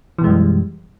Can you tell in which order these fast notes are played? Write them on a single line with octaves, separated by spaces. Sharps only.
E3 B2 G#3 F#2 G3